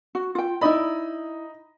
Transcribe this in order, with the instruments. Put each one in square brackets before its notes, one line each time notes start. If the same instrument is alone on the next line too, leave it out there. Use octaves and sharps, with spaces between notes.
[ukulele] F#4
F4 G5
[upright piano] D#4 D#5 B5 [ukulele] E4 D5